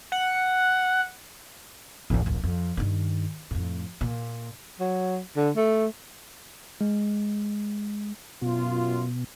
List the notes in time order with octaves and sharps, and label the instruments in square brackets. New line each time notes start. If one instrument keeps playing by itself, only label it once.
[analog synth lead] F#5
[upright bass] A1 D#2
D1 A#1
F2
G2 D#3
F2 A2
A#2
[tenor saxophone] F#3
D3
A3
[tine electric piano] G#3
[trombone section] F#2 F4 [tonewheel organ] B2